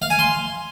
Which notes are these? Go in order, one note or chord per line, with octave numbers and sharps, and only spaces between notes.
F5
G#5
C6